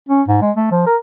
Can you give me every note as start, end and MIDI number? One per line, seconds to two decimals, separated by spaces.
0.09 0.22 61
0.28 0.38 44
0.42 0.51 56
0.57 0.69 57
0.71 0.85 53
0.86 0.97 70